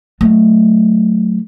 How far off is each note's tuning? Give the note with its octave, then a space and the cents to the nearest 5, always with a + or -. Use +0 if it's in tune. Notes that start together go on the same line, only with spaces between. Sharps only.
F#3 +0 A3 +0